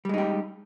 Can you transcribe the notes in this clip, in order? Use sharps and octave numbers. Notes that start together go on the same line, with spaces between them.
G3 G#3 D#4 G4